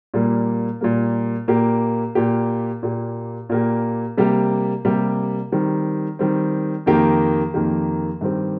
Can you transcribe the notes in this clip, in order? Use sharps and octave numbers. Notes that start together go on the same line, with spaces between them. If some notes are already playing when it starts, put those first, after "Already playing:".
A#2 G3 A#3
A#2 G3 A#3
A#2 A#3 G4
A#2 A#3 G4
A#2 A#3 G4
A#2 A#3 G4
C3 G3 A#3 G4
C3 G3 A#3 G4
D#3 G3 C4
D#3 G3 C4
F2 D#3 A#3 G4
F2 D#3 A#3 G4
G2 D#3 C4 G4